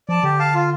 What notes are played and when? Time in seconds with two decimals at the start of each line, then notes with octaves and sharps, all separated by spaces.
0.09 F3 D5 A5
0.23 D3 G4
0.39 F5 A5
0.54 F4